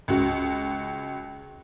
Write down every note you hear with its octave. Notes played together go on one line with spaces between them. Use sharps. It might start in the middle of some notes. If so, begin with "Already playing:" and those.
C#2 F#4